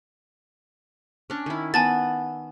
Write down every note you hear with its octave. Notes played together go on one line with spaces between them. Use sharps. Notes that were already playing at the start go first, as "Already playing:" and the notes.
C#4 D4
D#3 E4
B3 G#5 A5 A6